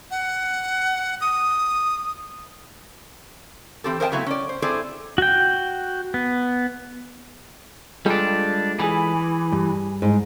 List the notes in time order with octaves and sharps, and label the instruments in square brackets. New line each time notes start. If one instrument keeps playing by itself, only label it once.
[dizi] F#5
D#6
[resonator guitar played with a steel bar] E3 C4 G4 A4
A#4 C5 D#5 E5 G5 A5
C#3 F#3 A3 B3 C4 E4
C#4 D5
C5
C4 E4 G#4 A4 C5 D5
[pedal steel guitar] F#4 G5
B3
[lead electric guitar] G3 D4 [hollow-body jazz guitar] G#3 F4 A4
[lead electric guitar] E3 [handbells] G#4 G#5 B5
[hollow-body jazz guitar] G2
[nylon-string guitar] G#2